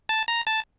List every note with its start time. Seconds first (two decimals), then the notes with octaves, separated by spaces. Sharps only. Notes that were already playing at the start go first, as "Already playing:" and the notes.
0.09 A5
0.28 A#5
0.47 A5